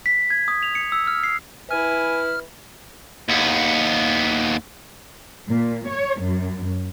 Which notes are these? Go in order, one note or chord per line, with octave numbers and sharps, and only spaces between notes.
B6
G#6
D#6
F7
C#7
E6
F6
C7
E4 B4 G#5 F6
D#2 B3
A#2
C#5
F#2